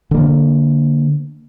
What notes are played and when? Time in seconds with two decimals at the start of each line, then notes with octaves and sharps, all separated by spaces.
0.11 D3 A#3